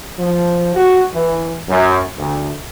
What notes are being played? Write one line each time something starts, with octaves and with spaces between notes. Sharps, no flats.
F3
F#4
E3
F#2
D2